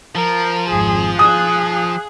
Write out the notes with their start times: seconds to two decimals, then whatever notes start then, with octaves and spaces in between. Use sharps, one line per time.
0.15 F3 A#4
0.69 G#1 F2 G#4
1.19 G#4 F5 D#6 F#6